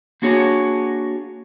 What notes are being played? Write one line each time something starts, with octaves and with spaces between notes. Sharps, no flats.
A#3 D4 F#4 G#4 C#5